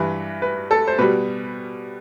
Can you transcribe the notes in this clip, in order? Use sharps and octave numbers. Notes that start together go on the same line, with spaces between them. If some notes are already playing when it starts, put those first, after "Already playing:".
Already playing: G2 E3 G3 B4
B4
A4
C5
B2 G3 B4